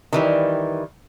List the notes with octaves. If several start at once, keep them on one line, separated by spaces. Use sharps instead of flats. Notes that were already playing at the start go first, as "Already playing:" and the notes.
D#3 E3 G3